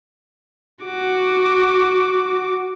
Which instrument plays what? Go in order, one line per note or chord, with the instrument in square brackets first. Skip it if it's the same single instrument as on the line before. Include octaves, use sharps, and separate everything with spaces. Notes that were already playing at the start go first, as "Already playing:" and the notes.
[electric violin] F#4 D6